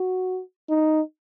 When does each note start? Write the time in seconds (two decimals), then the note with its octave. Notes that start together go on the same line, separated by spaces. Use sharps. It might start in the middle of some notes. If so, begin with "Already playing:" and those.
Already playing: F#4
0.69 D#4